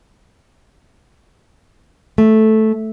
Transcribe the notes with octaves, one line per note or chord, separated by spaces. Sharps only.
A3